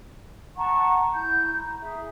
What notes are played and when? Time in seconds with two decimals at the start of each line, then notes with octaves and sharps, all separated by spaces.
0.56 F#5 A5 A#5 C#6
1.14 E4 G6
1.56 A#5
1.81 G#4 E5